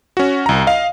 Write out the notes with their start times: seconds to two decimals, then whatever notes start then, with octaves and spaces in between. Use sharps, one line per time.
0.17 C#4 F#4
0.46 C2 A#5
0.67 D#5 F5